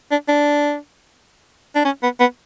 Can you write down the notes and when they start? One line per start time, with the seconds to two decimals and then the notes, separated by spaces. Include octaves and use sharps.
0.11 D4
0.28 D4
1.75 D4
1.85 C#4
2.03 B3
2.20 B3